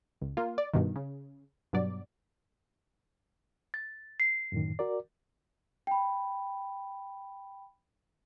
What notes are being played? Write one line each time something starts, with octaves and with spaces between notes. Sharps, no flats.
C#2
A#3 F4
D5
G2 B2 D#3
C#3
G2 B2 F#3 D5
A6
C7
F#2 A2 D#3
F#4 A#4 D5
G5 B5